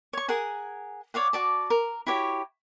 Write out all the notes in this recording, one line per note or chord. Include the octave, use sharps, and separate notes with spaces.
C#5 C#6
G#4 A#4 F#5 G#5
C#5 D5 F5 F#5
F#4 D5 A5
A#4
E4 F#4 G4 C#5